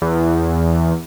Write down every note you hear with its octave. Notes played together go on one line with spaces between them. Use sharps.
E2